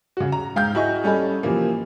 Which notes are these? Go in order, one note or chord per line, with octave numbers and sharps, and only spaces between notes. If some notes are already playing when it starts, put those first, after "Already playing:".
C#3 F#4
A#5
G#2 F5 G5 F6 G6
E4 F#4 G#4 D#5 C#6
G3 C#4 A4 D#5 B5
C3 E3 F3 A#3